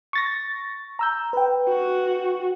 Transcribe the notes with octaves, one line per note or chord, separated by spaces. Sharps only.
C#6 A6 A#6
A#5 E6 G6
B4 G5
F#4